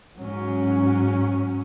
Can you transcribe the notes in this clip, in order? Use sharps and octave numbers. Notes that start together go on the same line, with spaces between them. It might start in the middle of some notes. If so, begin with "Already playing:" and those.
G#2 F#3 C#4